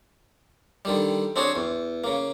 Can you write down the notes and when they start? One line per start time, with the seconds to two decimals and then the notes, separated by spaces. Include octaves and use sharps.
0.85 D3 D#3 G3
1.36 C4 D4 F#4 G#4 C#5
1.56 E2
2.04 C#3 A#3